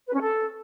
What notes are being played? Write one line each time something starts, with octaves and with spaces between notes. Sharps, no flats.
B4
C#4
A4